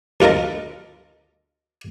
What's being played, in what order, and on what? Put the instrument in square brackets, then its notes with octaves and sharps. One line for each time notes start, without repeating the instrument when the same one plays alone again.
[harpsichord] D2 F4 A4 A#4 D#5